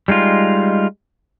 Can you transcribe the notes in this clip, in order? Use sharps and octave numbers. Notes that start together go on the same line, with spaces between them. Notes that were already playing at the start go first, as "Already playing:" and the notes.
G3 G#3 D#4 F4